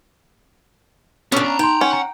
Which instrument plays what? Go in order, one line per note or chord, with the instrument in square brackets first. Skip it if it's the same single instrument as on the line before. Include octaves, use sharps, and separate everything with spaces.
[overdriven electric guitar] B2 D3 [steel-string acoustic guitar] C#4 D4
[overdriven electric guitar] A5 A#5
[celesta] D#4 C6 [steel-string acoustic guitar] G5
[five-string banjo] C#4 [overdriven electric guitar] F#5
[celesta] A#5